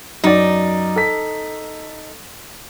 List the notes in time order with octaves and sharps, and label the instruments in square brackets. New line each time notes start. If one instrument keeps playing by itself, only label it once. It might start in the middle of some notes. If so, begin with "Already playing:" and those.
[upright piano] F#2 D5 [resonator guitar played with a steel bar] D#4
[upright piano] A4 B6